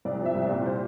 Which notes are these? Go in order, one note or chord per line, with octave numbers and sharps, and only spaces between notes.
C2 D5
F3 E5
C2
D5
A#2
C5